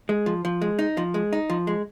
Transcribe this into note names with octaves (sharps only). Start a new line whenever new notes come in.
G#3
F3
F3
G#3
D#4
F3
G#3
D#4
F3
G#3